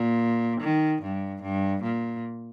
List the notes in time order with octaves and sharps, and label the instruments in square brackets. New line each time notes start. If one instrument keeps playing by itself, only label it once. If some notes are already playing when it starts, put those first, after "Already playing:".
Already playing: [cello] A#2
D#3
G2
G2
A#2